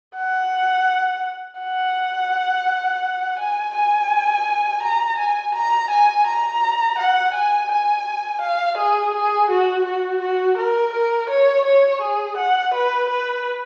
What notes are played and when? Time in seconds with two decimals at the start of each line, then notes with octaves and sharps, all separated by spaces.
0.16 F#5
1.60 F#5
3.39 G#5
3.74 G#5
4.83 A#5
5.18 G#5
5.55 A#5
5.90 G#5
6.27 A#5
6.98 F#5
7.34 G#5
7.70 G#5
8.41 F5
8.77 G#4
9.14 G#4
9.50 F#4
9.85 F#4
10.21 F#4
10.57 A#4
10.93 A#4
11.30 C#5
11.65 C#5
12.01 G#4
12.37 F#5
12.74 B4
13.09 B4